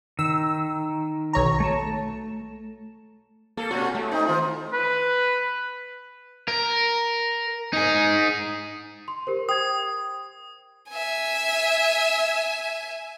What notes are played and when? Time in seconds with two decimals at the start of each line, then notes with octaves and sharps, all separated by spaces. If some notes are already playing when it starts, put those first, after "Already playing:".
0.19 D#3 E6
1.33 B1 C#5 A#5
1.60 A3 A5
3.57 A#3 A4
3.71 B2 C#4 F#4
3.95 A2 A3
4.11 C4 D#4
4.26 D#3 F4
4.73 B4
6.48 A#4
7.73 D#4 G#4
9.08 C6
9.27 G4 A#4 C5
9.49 G5 D#6 G#6
10.90 E5 G#5